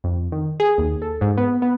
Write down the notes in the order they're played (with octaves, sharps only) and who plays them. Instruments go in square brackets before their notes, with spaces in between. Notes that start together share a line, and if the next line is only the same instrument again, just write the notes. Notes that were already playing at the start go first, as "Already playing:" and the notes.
[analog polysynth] F2
D#3
G#4
D#2
A4
G#2
B3
B3